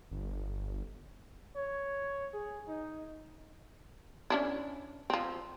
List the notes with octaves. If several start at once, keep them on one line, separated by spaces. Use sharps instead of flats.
G1
C#5
G#4
D#4
C#4 D4 E4
F3 C4